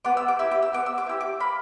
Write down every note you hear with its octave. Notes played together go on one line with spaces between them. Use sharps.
B3 D6
E6
D6
E4 G4 E6
D6
E6
B3 D6
E6
D6
E4 G4 E6
D6
A#3 B5